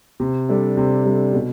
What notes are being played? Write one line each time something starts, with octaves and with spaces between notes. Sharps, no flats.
C3
G3 D4 A4
C3
G3 D4 A4
B2